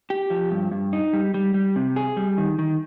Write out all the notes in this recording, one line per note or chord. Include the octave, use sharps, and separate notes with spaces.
G4
F3
G2
G2
D#4
G3
G3
G3
C3
G#4
G3
D#3
D#3